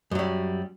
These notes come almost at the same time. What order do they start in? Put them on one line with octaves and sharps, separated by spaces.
F#2 F#3 G3